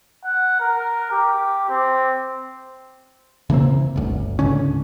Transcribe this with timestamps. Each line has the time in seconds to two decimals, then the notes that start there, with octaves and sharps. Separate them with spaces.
0.24 F#5
0.60 A#4
1.11 G4
1.70 C4
3.50 C#3 E3 A#3 C4
3.96 G1 D2
4.39 C#2 G#2 D3 C#4